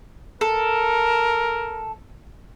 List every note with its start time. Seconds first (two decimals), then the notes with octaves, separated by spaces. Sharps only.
0.41 A4 A#4